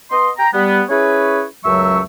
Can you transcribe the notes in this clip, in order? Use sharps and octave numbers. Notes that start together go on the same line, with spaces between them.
B3 D#5 C6
G5 A#5
G3 B3
C#4 E4 G#4 B4 C#5
C#2 F#2 F#3 A3 E5 C#6